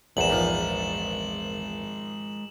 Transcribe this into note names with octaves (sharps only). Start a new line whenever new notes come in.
A#1 E2 G#3 A#4 E7 F#7
G#2 F3